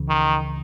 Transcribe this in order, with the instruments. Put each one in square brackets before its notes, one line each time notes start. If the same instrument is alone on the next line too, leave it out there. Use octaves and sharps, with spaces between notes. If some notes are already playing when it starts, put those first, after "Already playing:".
Already playing: [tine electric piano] C#2 C#3 E3
[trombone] D#3